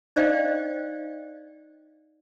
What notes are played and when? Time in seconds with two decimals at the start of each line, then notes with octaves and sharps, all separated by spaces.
0.16 D#4 C5 D5 D#5 F5 G5